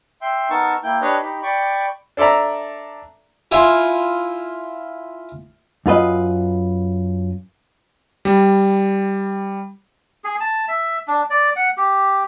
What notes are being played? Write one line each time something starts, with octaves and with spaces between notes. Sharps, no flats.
E5 G5 C6
B3 D#4 A#4 A5 C#6 E6
A#3 E4 G5 G6
D4 G4 B4 C#5 D#5
D#4 G4 B5
D5 G5 B5 C#6 D6
D4 A4 D5 E5 A#5
E4 F4 G#5
F#2 F4 B4 D#5
G3
G#4
A5
E5
D4
D5
F#5
G4